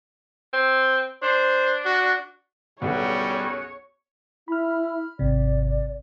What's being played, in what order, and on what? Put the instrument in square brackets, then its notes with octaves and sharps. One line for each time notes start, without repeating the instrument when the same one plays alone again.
[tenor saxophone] C4
[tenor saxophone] D4 [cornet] C5
[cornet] F#4
[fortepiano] B1 D3 B3 [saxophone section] F#2 F#4 G#4 [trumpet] G3 [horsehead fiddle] C#5
[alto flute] E4 [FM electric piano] B5 F6
[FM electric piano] G#1 C3 [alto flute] D5